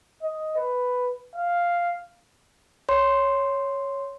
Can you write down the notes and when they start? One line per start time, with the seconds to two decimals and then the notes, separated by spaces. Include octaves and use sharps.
0.23 D#5
0.56 B4
1.36 F5
2.89 C#5 C6